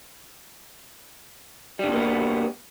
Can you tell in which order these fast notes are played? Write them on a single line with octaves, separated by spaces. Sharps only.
G3 D3 B2 A#3 B3